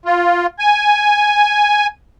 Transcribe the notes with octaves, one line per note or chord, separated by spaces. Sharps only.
F4
G#5